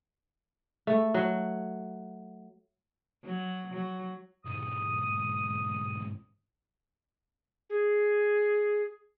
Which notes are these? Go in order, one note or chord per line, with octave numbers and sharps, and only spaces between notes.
A3
F#3
F#3
F#3
B1 G#2 D#6
G#4